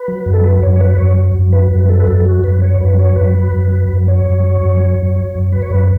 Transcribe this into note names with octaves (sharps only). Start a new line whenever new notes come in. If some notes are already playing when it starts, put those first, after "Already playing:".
Already playing: B4
F#3
F#2
A4
F#3 B4
F#2 C#5
C#5
F#3 B4
F#2 C#5
F#3
F#2
F#3 B4
F#2
B4
F#3 A4
B4
F#2 A4
F#3 F#4
F#2 B4
F#3 C#5
F#2 B4
F#3 C#5
F#2 B4
F#3
F#2
F#3
F#2
F#3 C#5
F#2
F#3
F#2
F#3
F#2
F#3
F#2
F#3 B4
C#5
F#2 B4